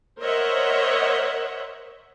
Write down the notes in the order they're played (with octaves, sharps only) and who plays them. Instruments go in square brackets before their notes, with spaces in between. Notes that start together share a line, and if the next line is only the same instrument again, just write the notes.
[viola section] A#4 C5 C#5 D#5 E5 F#5